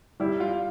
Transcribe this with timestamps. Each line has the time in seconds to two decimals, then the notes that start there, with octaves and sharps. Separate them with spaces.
0.20 G3 E4
0.40 F4